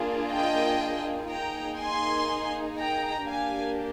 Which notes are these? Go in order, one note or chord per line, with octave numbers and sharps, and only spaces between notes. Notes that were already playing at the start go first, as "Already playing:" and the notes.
Already playing: A#3 D4 F4 G#4
D#5 G5
A#3 D#4 G#4 G5 A#5
G#5 C6
G5 A#5
A#3 D4 G4 F5 G#5